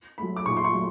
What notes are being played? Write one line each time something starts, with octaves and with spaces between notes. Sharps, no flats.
F#3 A3 B5
D6
A#2 C#6
C6
C#6
F#3 A3